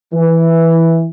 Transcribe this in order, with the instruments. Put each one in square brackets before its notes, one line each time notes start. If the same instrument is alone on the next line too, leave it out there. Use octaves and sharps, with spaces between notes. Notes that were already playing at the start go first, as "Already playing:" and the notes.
[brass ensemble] E3